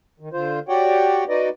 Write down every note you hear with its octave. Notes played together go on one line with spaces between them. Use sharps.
D#3
D3 F4 C5
F#4 G4 C#5 D5 F#5 G5
D#4 F#4 B4 D5 D#5